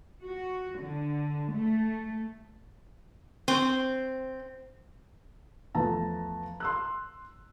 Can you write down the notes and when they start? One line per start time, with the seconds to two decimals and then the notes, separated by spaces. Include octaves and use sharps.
0.25 F#4
0.81 D3
1.53 A3
3.48 C4
5.75 E2 F3 A3 B3 A5 A#5
6.60 C6 E6 F#6